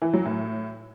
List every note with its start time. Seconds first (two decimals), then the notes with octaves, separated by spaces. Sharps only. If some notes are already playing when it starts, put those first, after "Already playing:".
0.02 E3
0.13 F#3
0.25 A2